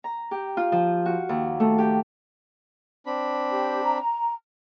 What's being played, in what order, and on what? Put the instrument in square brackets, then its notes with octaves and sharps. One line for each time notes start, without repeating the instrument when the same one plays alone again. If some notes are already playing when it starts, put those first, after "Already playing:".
[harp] A#5
G4
F4
F3
F#4
D#2
A3
G4
[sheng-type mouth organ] C4 D4 B5
[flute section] G4
A#5